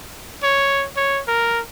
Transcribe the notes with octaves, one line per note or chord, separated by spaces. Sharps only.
C#5
C#5
A#4